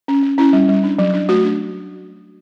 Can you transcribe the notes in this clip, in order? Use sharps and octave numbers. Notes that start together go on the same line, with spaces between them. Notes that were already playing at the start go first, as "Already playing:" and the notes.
C#4
C#4
C#4 E4
G3
G3
D4
F#3
D4
A3 F#4
D4